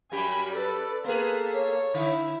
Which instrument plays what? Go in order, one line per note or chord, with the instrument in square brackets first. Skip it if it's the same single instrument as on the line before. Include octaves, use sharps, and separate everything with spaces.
[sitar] F#2 G3 G4 [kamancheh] G#5 B5
[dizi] A4 [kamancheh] B4 D5
[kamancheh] A#3 A4 [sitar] B3 G#4 [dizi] B4
[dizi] C#5
[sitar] D3 [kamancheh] E4